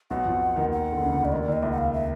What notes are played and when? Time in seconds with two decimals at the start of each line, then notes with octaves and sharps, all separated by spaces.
0.10 B1 B2 F#5
0.26 F2 F3
0.56 D#2 D#3
0.72 F#5
0.92 D3
1.02 C#2 C#3
1.12 C#2 C#3
1.22 D2 D3 D5
1.32 D#2 D#3 D#5
1.43 D5
1.48 D#2 D#3 D#5
1.62 C#2 C#3 E5
1.72 F#5
1.78 F5
1.93 E5